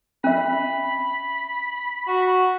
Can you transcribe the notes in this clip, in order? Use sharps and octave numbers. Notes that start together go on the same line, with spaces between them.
C#4 E5 B5
F#4